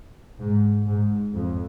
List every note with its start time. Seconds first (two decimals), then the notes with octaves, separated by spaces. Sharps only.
0.39 G#2
0.86 G#2
1.34 F2